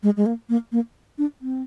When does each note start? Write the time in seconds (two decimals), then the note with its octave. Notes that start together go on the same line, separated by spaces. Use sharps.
0.03 G#3
0.17 G#3
0.26 A#3
0.49 A#3
0.72 A#3
1.18 D4
1.41 C4